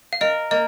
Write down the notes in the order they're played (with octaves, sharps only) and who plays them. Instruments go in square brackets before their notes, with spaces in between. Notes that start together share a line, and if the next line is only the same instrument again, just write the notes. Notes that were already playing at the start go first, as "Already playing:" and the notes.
[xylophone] F5
[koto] A#4 [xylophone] D#5
[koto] A#3 [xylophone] D#5